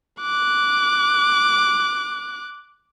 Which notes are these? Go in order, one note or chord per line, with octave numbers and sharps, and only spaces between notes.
D6 F#6